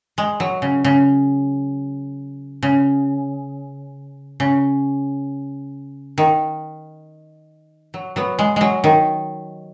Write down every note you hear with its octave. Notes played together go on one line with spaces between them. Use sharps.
G#3
F#3
C#3
C#3
C#3
C#3
D#3
F#3
F#3 B3
G#3
F#3 G#3
D#3